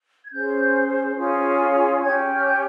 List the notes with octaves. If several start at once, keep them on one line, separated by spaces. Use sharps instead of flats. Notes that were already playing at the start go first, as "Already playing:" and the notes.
G#6
C#4 G#4 C5 G6
C#4 F4 G#4 C#5
C#4 G4 C#5 G#6
F6
G6